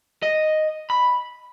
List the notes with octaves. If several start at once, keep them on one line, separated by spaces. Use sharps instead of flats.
D#5
B5